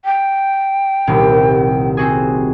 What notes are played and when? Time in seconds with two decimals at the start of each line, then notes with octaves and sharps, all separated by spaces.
0.05 G5
1.07 D#1 C2
1.97 C4 F#4 G#4